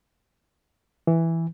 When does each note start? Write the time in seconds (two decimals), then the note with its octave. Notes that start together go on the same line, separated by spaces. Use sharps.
1.07 E3